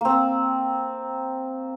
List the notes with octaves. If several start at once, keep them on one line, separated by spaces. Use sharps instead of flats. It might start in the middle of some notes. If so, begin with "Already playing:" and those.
A#3 C4